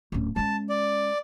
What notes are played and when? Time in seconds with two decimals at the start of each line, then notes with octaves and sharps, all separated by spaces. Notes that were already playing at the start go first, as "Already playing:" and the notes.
0.12 D1 C#4
0.36 G#3 C#4 A5
0.69 D5